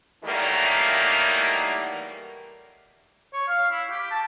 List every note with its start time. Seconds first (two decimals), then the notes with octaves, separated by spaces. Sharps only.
0.24 D#3 E3 F#3 G3 A3 A#3
3.33 C#5
3.48 F5
3.71 E4
3.90 G4
4.11 A5